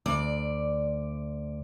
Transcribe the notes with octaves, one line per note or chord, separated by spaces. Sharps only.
D2 D5